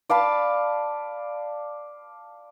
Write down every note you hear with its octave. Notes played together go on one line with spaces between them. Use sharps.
D5 F5 A5 B5